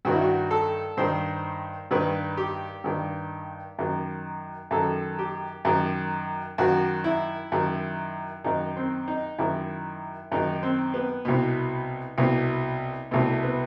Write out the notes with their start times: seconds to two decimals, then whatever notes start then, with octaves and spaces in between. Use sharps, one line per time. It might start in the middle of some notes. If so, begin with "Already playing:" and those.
0.05 G2 D#3 F#4
0.13 E4
0.22 F#4
0.51 A4
0.97 G2 D#3 C5
1.91 G2 D#3 B4
2.37 G4
2.84 G2 D#3
3.79 F#2 D#3
4.71 F#2 D#3 A4
5.19 G4
5.65 F#2 D#3
6.58 F#2 D#3 F#4
7.04 E4
7.52 F#2 D#3
8.44 F#2 D#3 D#4
8.77 C4
9.08 D#4
9.38 F#2 D#3 E4
10.32 F#2 D#3 D#4
10.63 C4
10.94 B3
11.25 C2 B2
12.18 C2 B2
13.11 C2 B2 A3
13.43 B3